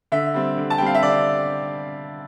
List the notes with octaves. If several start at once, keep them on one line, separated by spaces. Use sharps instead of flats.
D3 E5
G3 C4
D3
A5
G3 C4 G5
F5
E5
D3 D5